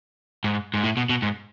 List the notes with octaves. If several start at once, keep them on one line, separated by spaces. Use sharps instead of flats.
G#2
G#2
A2
B2
B2
G#2